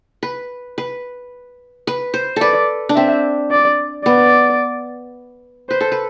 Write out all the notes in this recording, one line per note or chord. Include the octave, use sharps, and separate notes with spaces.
B4
B4
B4
C5
A4 B4 D5
D4
C4 E5
D5
B3 D5
B4 C5
A4
B4